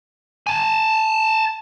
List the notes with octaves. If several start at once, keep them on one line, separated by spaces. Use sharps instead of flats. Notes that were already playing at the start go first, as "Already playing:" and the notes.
G#5 A5